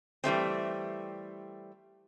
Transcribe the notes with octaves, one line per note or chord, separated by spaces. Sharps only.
E3 G3 A3 C4